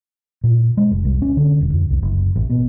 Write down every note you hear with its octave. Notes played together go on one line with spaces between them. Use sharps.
A#2
G#3
F1
C2
C#4
D3
E1
F2
C2
F#1
A1
B2